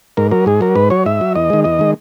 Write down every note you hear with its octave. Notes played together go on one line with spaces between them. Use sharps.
G#2 A#4
F#3 A#4
G#2 G#4
F#3 A#4
G#2 B4
F#3 C#5
G#2 E5
F#3
E2 D#5
D#3 G#3
E2 D#5
D#3 G#3